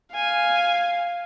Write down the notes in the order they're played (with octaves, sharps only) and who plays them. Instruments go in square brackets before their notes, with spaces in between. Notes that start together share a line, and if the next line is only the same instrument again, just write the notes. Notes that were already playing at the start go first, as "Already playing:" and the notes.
[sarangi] F5 [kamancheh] G#5